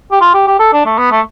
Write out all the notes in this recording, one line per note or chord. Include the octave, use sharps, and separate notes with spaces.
G4
F4
G4
G4
A4
D4
A3
B3
A3